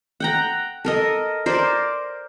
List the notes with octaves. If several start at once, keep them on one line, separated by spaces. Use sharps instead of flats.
F#5 G5 A#5
A4 A#4 D#5
A#4 C5 D5